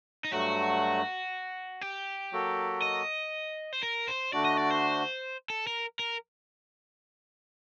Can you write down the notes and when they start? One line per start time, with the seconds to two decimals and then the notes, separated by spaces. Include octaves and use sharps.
0.24 D#4
0.32 G2 F#3 A3 F#4
1.81 G4
2.32 F#3 A#3 F#4 A4
2.82 D#5
3.73 C5
3.83 A#4
4.08 C5
4.33 D3 A3 D4 F#4 D5
4.45 D#5
4.57 D5
4.71 C5
5.50 A4
5.67 A#4
5.99 A#4